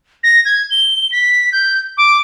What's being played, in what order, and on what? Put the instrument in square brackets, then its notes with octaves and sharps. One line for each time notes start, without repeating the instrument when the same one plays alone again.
[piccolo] A#6
G#6
G7
B6
G6
D6